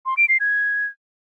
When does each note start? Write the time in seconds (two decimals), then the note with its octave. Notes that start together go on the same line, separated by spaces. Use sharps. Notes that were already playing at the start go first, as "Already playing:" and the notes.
0.06 C6
0.17 D7
0.29 C7
0.40 G#6